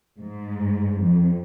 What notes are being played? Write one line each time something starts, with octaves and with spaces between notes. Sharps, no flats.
G#2
F2